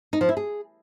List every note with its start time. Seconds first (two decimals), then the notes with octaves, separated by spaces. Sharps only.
0.13 D#4
0.21 F3
0.29 E4
0.37 G#4